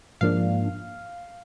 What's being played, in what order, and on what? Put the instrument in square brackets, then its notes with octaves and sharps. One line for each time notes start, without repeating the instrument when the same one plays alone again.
[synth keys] G#2 F3 A#3 D4 F5